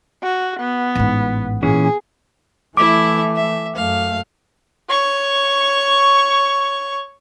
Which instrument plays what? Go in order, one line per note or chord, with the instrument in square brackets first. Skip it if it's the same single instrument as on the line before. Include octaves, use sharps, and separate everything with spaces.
[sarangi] F#4
B3
[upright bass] A1 G#2
[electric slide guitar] A#2 E3 C#4 [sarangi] G#4
[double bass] E3 A3 [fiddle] E4 E5 [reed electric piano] D6
[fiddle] E5
[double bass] F#2 A3 [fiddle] F5
[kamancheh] C#5 C#6